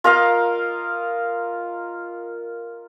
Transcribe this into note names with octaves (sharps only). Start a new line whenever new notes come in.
F4 A#4 D#5 F5